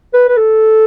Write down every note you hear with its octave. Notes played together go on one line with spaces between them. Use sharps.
B4
B4
A4